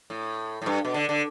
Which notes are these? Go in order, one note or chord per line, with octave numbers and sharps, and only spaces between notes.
A2
A2
G2
B2
D3
D3